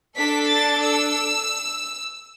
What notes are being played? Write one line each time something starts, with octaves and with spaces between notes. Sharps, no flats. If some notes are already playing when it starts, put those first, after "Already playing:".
D4 A4 B6
A6
E6